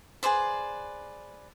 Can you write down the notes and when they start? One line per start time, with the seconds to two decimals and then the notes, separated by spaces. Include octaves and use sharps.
0.23 G#4 B4 C5 D5